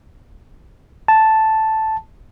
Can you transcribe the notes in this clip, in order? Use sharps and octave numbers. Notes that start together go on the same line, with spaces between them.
A5